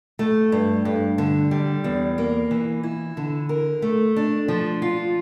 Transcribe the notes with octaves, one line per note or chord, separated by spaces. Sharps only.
A3
G2
G2
D3
G3
E2
A#3
E3
E4
D3
A#4
A3
D4
F3
F4